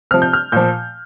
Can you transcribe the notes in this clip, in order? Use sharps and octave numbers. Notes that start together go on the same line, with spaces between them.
C3 F3 F6
G6
F6
A#2 F3 G6